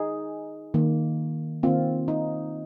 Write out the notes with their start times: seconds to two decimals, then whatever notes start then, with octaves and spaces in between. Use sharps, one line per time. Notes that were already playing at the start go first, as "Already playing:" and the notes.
Already playing: D#4 G#4
0.74 D#3 A#3
1.63 D#3 A#3 C4 F4
2.08 D#4